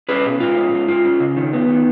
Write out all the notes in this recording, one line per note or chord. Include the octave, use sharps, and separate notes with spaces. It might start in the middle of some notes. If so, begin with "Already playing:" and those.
C#4 G#4 B4
B2
G#2 F4
C#4
G#2
F4
C#4
C#3
D#3
B3
D#3